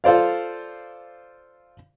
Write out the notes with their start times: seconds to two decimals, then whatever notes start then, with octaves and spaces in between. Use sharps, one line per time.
0.04 F4 A4 C5 D5 F5